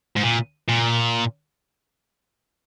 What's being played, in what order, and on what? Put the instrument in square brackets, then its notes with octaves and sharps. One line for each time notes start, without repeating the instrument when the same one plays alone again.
[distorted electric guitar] G#2
A#2
A#2